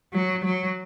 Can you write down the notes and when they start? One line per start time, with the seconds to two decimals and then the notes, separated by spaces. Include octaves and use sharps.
0.13 F#3
0.44 F#3